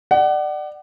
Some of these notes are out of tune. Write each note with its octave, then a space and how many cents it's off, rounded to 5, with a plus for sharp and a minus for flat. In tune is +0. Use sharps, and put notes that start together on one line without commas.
D5 +25 F#5 +30